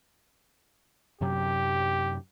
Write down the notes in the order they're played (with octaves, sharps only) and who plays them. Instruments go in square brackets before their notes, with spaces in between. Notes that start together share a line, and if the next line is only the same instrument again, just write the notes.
[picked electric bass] F#2 C3 F#3 [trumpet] G4